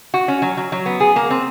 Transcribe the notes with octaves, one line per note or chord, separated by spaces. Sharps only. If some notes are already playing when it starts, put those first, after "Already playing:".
F#4
C#4
F#3
F#3
F#3
B3
G#4
A#3
C4